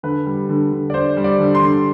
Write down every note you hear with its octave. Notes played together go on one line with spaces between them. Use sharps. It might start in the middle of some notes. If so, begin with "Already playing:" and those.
D3 B4
G3
D3
D3
D5
D4 C5
G3
D5
D3
C6
D3